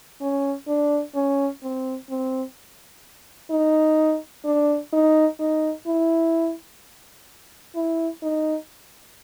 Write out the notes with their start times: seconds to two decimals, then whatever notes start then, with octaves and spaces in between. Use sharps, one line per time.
0.21 C#4
0.68 D4
1.15 C#4
1.63 C4
2.10 C4
3.51 D#4
4.45 D4
4.93 D#4
5.39 D#4
5.86 E4
7.75 E4
8.23 D#4